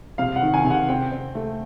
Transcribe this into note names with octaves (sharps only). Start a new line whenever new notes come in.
C3 F5
F#5
D#3
G#5
C3
F#5
C4 G5
C4
A3